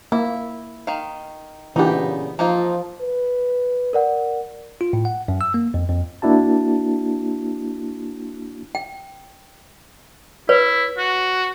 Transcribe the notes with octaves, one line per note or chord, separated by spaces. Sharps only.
A#3 E4
D#3 F5
A#2 C#3 E3 B3 D4 D#4 G4
F3 A#3 D#4 F4
B4
A#4 D5 F#5
F4
A2
F#5
F#2
E6
A#3
F2
F2
A#3 D4 E4 F#4 A5
G5
E4 B4 C#5
F#4